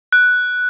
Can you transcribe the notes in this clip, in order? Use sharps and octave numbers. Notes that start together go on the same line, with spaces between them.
F#6